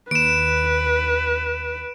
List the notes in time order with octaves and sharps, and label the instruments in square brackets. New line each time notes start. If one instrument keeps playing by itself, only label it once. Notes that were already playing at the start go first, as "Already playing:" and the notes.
[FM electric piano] D#2 [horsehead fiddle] B4 [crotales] D7 E7